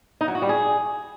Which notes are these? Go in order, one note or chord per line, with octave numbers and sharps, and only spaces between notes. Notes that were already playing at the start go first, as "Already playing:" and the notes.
D#4
F#3
F#4
G3
G#4